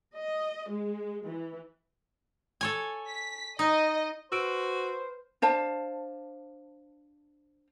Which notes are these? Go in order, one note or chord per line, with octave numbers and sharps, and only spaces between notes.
D#5
G#3
E3
A4 C#5 G#5
B6
D#4 D#5
F#4 B4 C5 E6 D7
D4 C5 F5 A5